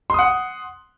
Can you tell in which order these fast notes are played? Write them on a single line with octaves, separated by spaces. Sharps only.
C6 D#6 F#5